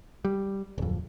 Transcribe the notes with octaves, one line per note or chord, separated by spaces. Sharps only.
G3
D1 F2